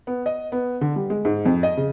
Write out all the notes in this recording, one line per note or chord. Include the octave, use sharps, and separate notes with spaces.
B3
D#5
B3
D3
G3
G#3
G#2
F2
D#5
C#3